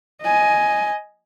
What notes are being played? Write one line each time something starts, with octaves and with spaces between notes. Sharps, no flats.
D#5 G#5